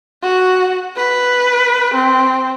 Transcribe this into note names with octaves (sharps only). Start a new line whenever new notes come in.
F#4
B4
C4